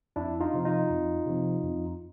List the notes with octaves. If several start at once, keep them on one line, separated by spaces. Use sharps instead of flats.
F2 D4 E4
D#4 F4
C3 F3
D#4 F4
F2
C3 F3
F2